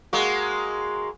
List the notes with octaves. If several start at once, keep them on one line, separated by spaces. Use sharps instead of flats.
G#3 A#3 F#4